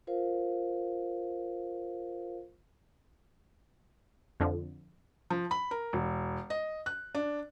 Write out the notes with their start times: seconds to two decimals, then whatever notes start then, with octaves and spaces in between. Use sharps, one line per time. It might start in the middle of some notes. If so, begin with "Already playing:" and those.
0.07 F4 A#4 C5 F5
4.40 F2 D3 F3
5.30 F3
5.51 B5
5.71 A#4
5.93 E1
6.50 D#5
6.86 F#6
7.15 D4